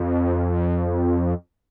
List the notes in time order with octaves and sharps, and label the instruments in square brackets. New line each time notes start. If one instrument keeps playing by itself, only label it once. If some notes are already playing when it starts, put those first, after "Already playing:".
Already playing: [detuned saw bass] F2